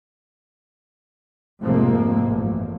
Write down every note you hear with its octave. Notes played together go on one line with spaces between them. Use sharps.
F1 G#2 F3 G#3 A#3 C4
A1 F#2